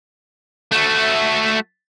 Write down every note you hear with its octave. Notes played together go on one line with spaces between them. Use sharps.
A3 F#4